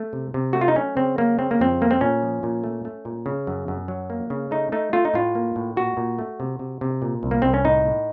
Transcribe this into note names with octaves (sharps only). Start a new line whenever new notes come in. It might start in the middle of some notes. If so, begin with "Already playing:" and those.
Already playing: A3
C3
C3
A3 F#4
F4
D#4
F#3 C#4
C#3 C4
F#3 A#3
C#3 C4
A#3
F2 C4
A3 A#3
C4
A#2 C#4
F3
A#2
A3
A3
A#2
C#3
F#2
F#2
F#3
A#3
C#3
A3 D#4
A3 D#4
A3 F4
D#4
A2 F4
A#3
A2
A#2 F#4
A#2
A3
C3
C3
C3
A#2
C2
A#3
C2 C4
C#4
A2 D#4
A2